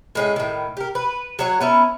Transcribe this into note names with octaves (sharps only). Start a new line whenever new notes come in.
A2 G#3 C#4
A2 D#3
G4 A#4
B4
F#3 C#5 F#5
B3 C#4 E4 A#5